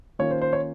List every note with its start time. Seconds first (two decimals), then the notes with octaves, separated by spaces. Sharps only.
0.19 D#3 A#3 C#4 F4 C#5
0.31 C5
0.42 C5
0.53 C#5